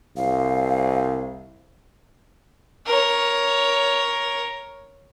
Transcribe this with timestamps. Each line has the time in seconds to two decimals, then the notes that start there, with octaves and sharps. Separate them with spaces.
0.17 C2 F5
2.86 A#4 C#5